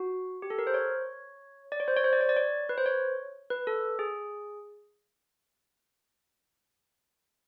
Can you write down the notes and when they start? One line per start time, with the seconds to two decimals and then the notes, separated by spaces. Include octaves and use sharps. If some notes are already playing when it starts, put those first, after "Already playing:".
Already playing: F#4
0.42 G4
0.50 A4
0.59 A#4
0.67 C5
0.74 C#5
1.72 D5
1.80 C#5
1.88 C5
1.97 C#5
2.04 C5
2.13 D5
2.21 C#5
2.29 D5
2.37 C#5
2.69 B4
2.78 C5
2.86 C#5
3.50 B4
3.67 A4
3.99 G#4